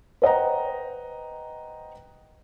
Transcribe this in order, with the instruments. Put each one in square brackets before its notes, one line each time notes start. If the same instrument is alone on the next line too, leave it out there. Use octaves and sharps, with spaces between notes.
[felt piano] B4 C5 D#5 F#5 G5 A#5